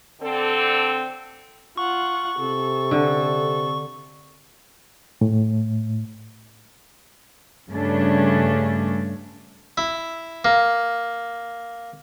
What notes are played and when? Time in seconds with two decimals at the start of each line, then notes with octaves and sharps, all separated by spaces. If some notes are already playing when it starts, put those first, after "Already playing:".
0.21 D3 C4 A4
1.77 F4 F#5 C#6
2.39 C3 A4
2.91 D3
5.21 A2
7.70 G2 C#3 A3 C#4 D4
9.78 E4
10.45 A#3